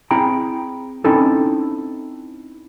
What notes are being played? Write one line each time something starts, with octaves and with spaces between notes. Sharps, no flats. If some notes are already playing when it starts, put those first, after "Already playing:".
C4 E4 G#4 G5 A#5 B5
C4 C#4 D#4 E4 A4